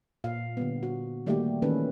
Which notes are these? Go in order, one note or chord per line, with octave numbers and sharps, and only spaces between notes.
A#2 F5
D3 G3 B3
F#4
D#3 G3 A3 A#3 F#4 G4
D#3 E3 A3 C#4 A4 B4